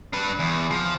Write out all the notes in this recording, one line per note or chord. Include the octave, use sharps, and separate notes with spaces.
D4 B4
E2
F3